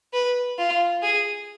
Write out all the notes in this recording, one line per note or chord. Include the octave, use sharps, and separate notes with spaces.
B4
F4
G#4